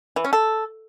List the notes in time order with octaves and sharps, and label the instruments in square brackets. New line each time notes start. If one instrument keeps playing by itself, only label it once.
[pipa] E3
C#4
A4